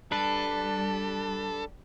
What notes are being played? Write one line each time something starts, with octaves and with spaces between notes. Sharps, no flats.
G3 D4 A4 B4 A5